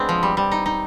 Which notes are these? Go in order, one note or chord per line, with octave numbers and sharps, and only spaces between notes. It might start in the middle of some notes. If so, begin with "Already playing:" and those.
Already playing: G#3 B3 C4 D4
F3
G3
G3
D#4
D#4